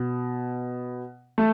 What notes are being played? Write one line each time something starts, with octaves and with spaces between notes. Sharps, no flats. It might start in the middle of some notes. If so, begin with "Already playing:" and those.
Already playing: B2
A3